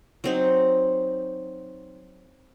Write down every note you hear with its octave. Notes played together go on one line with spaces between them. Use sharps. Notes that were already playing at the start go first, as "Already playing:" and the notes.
F#3 C4 D#4